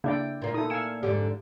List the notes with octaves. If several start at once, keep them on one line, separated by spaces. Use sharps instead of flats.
C#3 A#3 D4 E4 D5 G5
A#2 A#3
D#4 E4 A4 D#6
F5 G#5 E6 C#7
F2 G#2 D3 G4